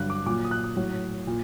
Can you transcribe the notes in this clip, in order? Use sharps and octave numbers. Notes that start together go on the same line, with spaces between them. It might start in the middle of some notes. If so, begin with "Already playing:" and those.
Already playing: G2 D3 F#3 F#6
D6
A#2 F#3 D6
D#6
F#6
D#6
A2 F#3
A#2